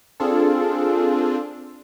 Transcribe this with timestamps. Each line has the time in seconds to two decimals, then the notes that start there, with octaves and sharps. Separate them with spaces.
0.20 C4 D4 F4 G#4 A4